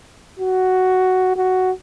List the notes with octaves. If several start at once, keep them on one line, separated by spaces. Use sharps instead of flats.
F#4
F#4